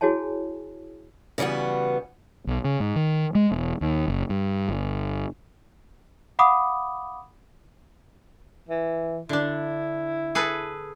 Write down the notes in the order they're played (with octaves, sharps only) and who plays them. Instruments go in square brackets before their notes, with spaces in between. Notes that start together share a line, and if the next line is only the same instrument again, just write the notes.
[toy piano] E4 F#4 G#4 C#5 G#5 A5
[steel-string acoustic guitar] C#3 E3 G3 B3 F#4
[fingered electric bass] B1
C#3
G#2
D#3
G#3
E1
D#2
F#1
G2
G1
[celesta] F5 F#5 B5 D6 D#6
[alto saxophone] E3
[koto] D3 D4 [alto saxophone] E4
[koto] G#4 A4 B4